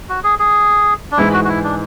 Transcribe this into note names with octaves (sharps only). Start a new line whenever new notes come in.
F#4
G#4
G#4
D4
G#2 E3 G#3 E4
F#4
F#4
E4
D4